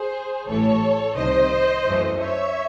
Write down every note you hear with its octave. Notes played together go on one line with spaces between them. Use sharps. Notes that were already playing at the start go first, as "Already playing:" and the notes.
Already playing: G#4 C5
A1 A2 E3 A4 C#5
C2 C3 D#3 C5 D#5
F#2 E3 A3
C#5 E5